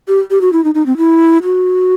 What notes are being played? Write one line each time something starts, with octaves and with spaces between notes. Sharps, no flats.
G4
G4
F#4
E4
D#4
D#4
C4
E4
F#4